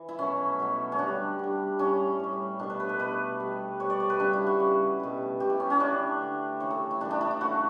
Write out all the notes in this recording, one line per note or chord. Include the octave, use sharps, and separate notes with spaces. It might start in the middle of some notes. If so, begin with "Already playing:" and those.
Already playing: E3
E4
B2 F#3 A3 C#4
B2 F#3 A3
C#4
D3 G3 D4
D3 G3
A2 G3 C#4
A2 G3
B2 A3 D4
B4
B4
A4
B2 A3 B4
B2 G3
B2 G3 C#5
D5
C#5
B4
C#3 G3 D4
E4
F#4
C#3 G3
B2 A3
B2 A3 G4
E4
C#4
C#4
D3 A3 D4
D3 A3
C#3 E3 A3 C#5
A4
E4
C#3 E3 A3 D4
D4
E4
E4
C#3 E3 A3 F#4